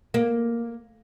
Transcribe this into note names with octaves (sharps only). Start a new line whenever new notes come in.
A#3